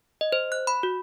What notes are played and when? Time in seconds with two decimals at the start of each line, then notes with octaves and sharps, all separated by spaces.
0.21 D#5
0.32 C5
0.52 F#6
0.67 B5
0.83 F#4